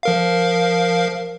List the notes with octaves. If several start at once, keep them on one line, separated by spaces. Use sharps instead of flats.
F3 A#4 F5